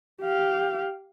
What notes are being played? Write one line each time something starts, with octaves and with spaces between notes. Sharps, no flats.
G4 F5